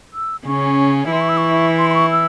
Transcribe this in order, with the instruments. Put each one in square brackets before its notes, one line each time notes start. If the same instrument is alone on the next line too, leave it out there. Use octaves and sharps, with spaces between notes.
[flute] E6
[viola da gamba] C#3 C#4 [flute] C#6
[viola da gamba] E3 E4 [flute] C6
[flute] C#6
E6
C#6
C6
C6
C#6
E6